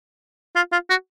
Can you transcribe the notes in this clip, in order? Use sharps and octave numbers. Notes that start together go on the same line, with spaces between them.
F4
F4
F#4